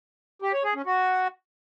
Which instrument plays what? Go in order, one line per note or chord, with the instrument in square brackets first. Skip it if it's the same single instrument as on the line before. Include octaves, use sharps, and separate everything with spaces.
[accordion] G4
C#5
G#4
C#4
F#4